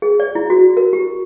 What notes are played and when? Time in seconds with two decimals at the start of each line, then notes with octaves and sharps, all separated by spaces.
0.02 G#4
0.20 D5
0.35 E4
0.50 F#4
0.77 A#4
0.93 G4